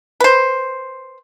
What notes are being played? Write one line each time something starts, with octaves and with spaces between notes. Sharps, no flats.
B4 C5